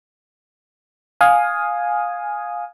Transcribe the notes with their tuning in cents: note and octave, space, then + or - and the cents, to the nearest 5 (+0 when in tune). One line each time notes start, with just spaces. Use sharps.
F5 +15 G#5 +0 D#6 +0